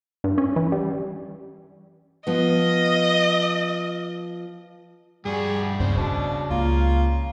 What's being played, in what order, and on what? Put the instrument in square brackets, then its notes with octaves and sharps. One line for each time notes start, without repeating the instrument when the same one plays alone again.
[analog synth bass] G2
C#4
E3
G3
[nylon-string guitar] F3 B3 [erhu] D#5
[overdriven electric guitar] G2 F#4 [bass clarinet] G3 [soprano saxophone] G#4
[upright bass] E2 G2 [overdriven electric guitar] C#3 [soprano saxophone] C5
[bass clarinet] B2 [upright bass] B3 [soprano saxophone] D4
[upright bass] C#2 [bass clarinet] A#3 [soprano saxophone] F4